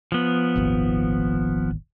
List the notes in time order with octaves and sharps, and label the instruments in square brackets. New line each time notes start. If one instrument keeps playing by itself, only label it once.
[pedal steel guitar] F3 B3
[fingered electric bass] D#1 G#1 D#2